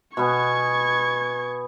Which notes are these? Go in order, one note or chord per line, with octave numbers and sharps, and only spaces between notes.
B2 B3 G#5 C#6 G#6